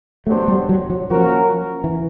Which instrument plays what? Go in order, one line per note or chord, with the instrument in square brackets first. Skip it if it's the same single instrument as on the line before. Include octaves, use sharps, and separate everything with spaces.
[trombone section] F#3 B3 D4 G4 C5 [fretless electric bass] A3
[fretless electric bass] G3
F#3
F#3
[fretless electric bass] F3 [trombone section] A#3 C#4 F#4 A#4
[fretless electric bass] E3